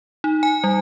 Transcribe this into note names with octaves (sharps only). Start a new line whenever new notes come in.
D#4
G#5
G3